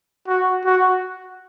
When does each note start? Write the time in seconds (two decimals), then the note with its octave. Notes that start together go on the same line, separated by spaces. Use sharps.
0.27 F#4
0.65 F#4